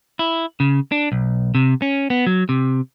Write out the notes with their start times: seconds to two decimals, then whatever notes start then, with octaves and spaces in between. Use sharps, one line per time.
0.19 E4
0.60 C#3
0.92 D4
1.12 B1
1.55 C3
1.82 C#4
2.10 B3
2.27 F#3
2.49 C3